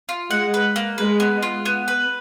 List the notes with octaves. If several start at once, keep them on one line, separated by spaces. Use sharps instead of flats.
F4
G#3 F#5
B4
A#3
G#3 B4
B3
F4
B3
B4